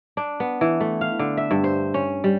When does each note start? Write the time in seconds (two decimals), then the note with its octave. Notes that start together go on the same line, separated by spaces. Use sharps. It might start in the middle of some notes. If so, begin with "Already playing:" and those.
0.17 D4
0.40 B3
0.61 E3
0.80 A3
1.01 F5
1.19 D3
1.37 E5
1.51 G2
1.64 C5
1.94 C#4
2.24 G3